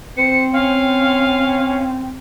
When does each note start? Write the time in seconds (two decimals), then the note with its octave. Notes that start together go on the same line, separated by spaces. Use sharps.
0.17 C4 C5 C#7
0.53 C#4 F5